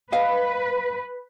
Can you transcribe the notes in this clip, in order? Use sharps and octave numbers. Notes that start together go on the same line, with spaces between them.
B4 D#5 F5